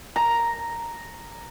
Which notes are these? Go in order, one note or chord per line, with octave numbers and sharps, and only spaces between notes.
A#5